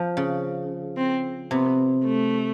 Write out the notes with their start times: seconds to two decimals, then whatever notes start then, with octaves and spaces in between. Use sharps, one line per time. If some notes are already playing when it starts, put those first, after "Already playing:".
Already playing: F3
0.17 C#3
0.97 C4
1.51 C3 B3
2.05 A3